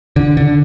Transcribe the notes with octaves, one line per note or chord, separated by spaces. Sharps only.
D3
D3